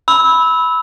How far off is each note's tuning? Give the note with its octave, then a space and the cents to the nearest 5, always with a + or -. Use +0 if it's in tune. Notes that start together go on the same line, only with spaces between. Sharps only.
B5 +0 E6 -20